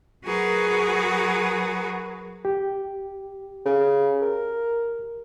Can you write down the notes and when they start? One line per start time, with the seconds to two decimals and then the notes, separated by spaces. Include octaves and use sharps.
0.24 F#3 F#4 G#4 A#4 B4
2.45 G4
3.65 C#3
4.21 A#4